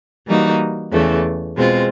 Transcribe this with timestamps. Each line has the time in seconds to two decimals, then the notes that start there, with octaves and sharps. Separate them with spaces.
0.27 E3 G3 A#3 D#4 F#4
0.92 E2 C#3 E3 A3
1.55 B2 G#3 C4 F4